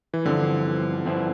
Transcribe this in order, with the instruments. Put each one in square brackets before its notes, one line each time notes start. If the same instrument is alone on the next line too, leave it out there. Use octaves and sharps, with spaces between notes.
[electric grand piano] E3
[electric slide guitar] G2 F3 C4 E4 [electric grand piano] D3
[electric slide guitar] G2 F3 C4 E4